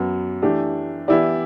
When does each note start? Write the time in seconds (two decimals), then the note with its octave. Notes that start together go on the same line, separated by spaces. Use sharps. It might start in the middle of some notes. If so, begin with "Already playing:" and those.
Already playing: F#2 F#3 B3 F#4
0.42 E3 A3 D4 G4
1.08 E3 B3 E4 G4 D5